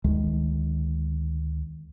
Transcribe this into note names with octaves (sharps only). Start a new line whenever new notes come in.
D2 D#3 G#3